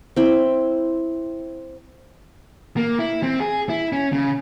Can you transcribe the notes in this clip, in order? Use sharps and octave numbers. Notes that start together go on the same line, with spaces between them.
C4 E4
A#3
E4
C4
G#4
E4
C#4
C#3